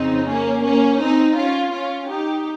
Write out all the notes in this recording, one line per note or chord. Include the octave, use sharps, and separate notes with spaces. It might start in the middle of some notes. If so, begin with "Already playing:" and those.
Already playing: F2 C#3 C4 D#4
A#3 C#4
A#3 C#4
C4 D#4
C#4 F4
C#4 F4
D#4 G4